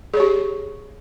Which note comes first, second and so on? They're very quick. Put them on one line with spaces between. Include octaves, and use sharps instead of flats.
G#4 C#5 G4